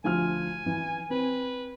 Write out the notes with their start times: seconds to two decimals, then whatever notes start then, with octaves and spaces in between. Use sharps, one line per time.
0.04 D2 F3 G#5 F6
0.66 E3
1.10 C4 B4